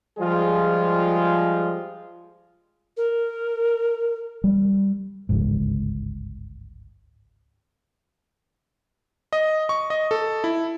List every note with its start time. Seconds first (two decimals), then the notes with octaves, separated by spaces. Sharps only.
0.19 F3 G3 G#3 F4 G#4
2.97 A#4
4.44 G3
5.29 G1 C#2 G#2
9.33 D#5
9.69 C#6
9.90 D#5
10.11 A4
10.44 E4